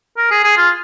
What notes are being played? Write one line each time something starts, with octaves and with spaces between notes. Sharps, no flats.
A#4
G#4
G#4
F4